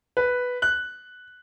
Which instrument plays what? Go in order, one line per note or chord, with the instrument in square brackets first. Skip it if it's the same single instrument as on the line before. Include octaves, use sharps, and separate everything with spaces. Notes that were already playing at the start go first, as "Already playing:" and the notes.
[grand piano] B4
F#6